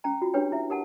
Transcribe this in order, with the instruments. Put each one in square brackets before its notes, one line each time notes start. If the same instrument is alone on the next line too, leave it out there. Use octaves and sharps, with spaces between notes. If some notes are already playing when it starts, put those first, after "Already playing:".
[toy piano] C#4 G5 A#5
F4 F#4
D4 G4 B4 C#5 G5
E4 E5
G4 A#4 F#5 A5